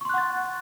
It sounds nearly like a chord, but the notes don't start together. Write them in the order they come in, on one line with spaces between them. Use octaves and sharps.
C#6 C6 F#6 F#5 A6